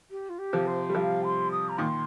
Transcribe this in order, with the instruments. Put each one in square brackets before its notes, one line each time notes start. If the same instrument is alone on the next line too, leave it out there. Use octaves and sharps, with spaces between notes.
[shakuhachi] G4
F4
G4
[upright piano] C3 F3
[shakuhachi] C5
[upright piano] G3
[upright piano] C3 F3 [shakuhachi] F5
[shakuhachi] C6
D#6
A#5
[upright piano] A#2 D#3 [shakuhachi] D#6
[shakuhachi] C6